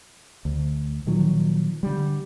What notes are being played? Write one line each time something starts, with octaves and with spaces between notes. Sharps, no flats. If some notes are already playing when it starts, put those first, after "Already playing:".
D2
A#2 D#3 F3 F#3
D3 G3